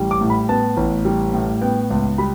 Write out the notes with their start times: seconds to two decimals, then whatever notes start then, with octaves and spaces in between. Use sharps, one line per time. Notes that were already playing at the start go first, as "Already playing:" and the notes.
Already playing: A1 G3
0.11 D6
0.21 A2
0.30 B5
0.49 B3 A5
0.77 A1
1.05 G3
1.34 A2
1.62 B3 G5
1.90 C#2
2.18 G3 B5